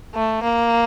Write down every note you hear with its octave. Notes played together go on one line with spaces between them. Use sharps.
A3
A#3